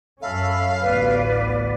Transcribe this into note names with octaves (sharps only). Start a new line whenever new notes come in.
F#2 C#4 A4 E5 F5 B5
A1 D2 B3 B4 D5